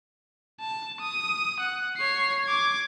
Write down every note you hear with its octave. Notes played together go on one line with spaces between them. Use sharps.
A5
D#6
F#5
C#5 C7
D6 G#6